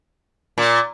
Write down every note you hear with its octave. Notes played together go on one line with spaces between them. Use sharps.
A#2